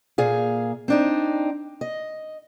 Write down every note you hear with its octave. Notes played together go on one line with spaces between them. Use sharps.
A#2 G#4 F5
C4 D4 D#4
D#5